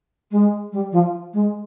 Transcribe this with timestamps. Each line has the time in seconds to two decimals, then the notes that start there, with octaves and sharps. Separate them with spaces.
0.31 G#3
0.72 G3
0.92 F3
1.34 G#3